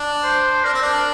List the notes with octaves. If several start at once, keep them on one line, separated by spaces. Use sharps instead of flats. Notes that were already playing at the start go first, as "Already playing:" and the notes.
Already playing: D4
C5
D4 A#4
C4
D4